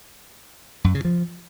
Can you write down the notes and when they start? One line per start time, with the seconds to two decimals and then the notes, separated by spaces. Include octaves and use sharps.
0.84 F#2
0.95 C#3
1.05 F3